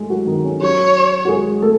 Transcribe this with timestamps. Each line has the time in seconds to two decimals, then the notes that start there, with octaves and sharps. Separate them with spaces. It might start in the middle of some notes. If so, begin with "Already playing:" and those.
Already playing: G#3 A3 G#4
0.10 F#3 F#4
0.27 D#3 D#4
0.44 C#4
0.61 F#3 F#4 C#5
1.25 F#4
1.28 G#3 G#4
1.62 A3 A4